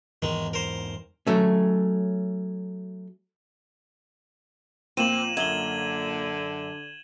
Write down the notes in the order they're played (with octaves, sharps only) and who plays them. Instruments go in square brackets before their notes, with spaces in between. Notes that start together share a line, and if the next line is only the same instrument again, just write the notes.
[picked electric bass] E2 G#2 E3 [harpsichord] D#3 G#3
[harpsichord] A#4 C5
[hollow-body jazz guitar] F#3 A3 C#4
[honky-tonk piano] A#2 A#3 [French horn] F3 [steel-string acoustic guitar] C4 [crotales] D#7 E7 F#7
[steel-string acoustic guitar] F#2 [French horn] D3 [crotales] G#6 F#7 G7